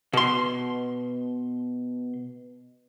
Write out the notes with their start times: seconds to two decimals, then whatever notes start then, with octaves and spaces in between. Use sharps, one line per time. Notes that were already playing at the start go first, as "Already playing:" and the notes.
0.13 B2 C6